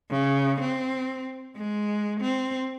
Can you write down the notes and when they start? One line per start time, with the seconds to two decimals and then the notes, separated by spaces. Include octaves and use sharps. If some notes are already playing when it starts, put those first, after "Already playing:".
0.11 C#3
0.61 C4
1.57 G#3
2.21 C4